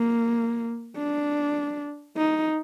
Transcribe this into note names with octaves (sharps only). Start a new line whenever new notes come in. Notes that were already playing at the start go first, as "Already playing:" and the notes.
Already playing: A#3
D4
D#4